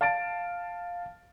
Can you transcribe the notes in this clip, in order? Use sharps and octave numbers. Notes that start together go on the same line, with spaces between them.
F5 A5 A6 D7